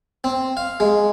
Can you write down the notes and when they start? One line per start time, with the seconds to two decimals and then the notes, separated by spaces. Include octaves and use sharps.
0.24 C4
0.57 F5
0.80 G#3